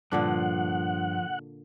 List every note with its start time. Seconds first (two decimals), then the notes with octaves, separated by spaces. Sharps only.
0.12 G2 A#2 D3 F3 D4 F#5